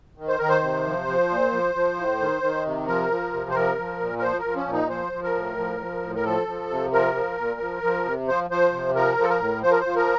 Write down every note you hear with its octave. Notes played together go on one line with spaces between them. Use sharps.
D#3
C5
D#3 A#4
C5
C3
F3
F3
A#2
F3
F3
A2
D#3
D#3
C3
F3 A#4
F3
C3
C5
F3 A#4
F3
A#2
A#4
F3 C5
A#4
F3
C#4
A#2
D#4
F3 C5
F3
A#4
A2
F3
F3
A2
A#4
F3 A4
F3
C3
F3 A#4
F3
A#2
F3
F3
C3
F3 C5
F3 C5
C3
F3 A#4
F3
A4
A#4
A2
F3 C5
A#4
C5
F3
A#4